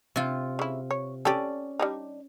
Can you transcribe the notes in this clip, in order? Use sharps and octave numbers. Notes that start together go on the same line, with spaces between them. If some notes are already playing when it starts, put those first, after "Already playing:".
C3 F4
C#3 E4
C#5
C#4 G4 A4 D5
G3 D4 D#4